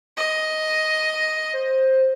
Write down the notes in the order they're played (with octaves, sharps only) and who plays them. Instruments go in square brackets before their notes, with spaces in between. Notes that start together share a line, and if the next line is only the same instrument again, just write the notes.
[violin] D#5
[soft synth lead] C5